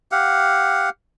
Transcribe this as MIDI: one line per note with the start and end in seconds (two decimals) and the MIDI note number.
0.12 0.89 67
0.12 0.89 77
0.12 0.89 78